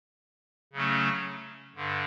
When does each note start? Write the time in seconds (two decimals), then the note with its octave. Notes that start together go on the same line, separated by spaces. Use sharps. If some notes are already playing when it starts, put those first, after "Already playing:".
0.73 C#3 F#3 A3 C#4
1.75 G2 D3